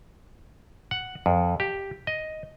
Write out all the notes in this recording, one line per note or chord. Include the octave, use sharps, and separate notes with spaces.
F#5
F2
G4
D#5